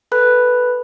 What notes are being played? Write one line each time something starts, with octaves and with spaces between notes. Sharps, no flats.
A4 B4 B5 F#6